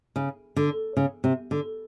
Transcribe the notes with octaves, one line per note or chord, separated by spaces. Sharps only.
C#3
D3
C#3
C3
D3